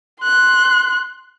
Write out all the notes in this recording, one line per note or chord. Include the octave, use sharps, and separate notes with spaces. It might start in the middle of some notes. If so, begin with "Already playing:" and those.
C6 F#6